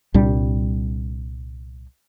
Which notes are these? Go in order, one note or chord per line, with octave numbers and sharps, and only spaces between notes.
C2 A#2 G3 D4